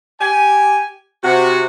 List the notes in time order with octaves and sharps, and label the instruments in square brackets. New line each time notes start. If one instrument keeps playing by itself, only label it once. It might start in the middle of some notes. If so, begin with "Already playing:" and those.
[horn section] G4 G#5
C3 F#4